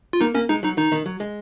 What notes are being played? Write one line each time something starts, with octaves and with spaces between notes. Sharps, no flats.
F4
A#3 D#4
A#3 C#4
G#3 D#4
F#3 D#4
D#3 D#4
D#3
F#3
G#3